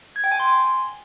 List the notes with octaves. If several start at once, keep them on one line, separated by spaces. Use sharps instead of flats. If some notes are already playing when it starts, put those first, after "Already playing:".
G#6
G5
G#5
C6